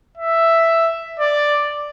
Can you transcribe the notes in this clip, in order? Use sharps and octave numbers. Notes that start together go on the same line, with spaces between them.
E5
D5